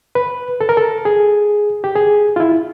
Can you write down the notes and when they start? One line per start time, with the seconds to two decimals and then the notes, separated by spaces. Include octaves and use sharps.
0.15 B4
0.61 A4
0.69 A#4
0.77 A4
1.05 G#4
1.84 G4
1.96 G#4
2.36 F4
2.40 E4